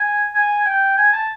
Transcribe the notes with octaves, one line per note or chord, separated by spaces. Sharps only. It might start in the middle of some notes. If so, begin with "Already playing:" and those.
Already playing: G#5
G#5
G5
G#5
A5